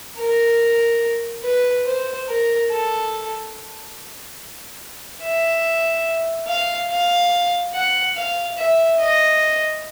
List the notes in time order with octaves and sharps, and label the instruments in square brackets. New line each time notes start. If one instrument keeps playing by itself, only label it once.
[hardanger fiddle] A#4
B4
C5
A#4
A4
E5
F5
F5
F#5
F5
E5
D#5